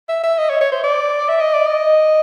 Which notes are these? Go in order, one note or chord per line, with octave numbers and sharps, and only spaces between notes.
E5
E5
D#5
C#5
C#5
C5
D5
E5
D#5
D5
D#5